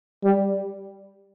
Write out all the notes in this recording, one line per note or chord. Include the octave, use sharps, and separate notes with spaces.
G3